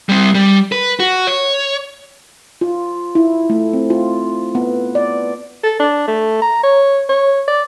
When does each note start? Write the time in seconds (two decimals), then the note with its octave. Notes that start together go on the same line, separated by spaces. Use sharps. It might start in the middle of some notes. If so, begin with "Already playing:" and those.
0.09 G3 C4
0.35 G3
0.72 B4
1.00 F#4
1.27 C#5
2.61 F4
3.15 E4
3.50 A3
3.73 C4
3.90 F4
4.55 B3
4.95 D5
5.63 A4
5.80 D4
6.08 A3
6.42 A#5
6.63 C#5
7.09 C#5
7.48 D5